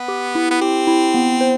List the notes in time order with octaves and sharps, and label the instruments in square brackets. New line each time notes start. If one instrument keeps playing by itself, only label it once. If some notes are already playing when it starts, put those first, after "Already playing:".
Already playing: [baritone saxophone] B3
[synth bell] G4
E4
[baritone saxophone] B3
[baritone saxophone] C4 [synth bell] G4
[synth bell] E4
B3
C5